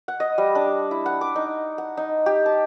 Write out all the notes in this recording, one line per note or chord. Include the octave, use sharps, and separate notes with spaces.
F#5
D#5
G3
D4
E4
F#5
D6
D#4
F#5
D#4
G4
A5